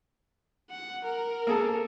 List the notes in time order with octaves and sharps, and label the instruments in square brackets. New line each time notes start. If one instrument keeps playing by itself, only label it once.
[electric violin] F#5
A#4
[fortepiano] A#3 G#4 A4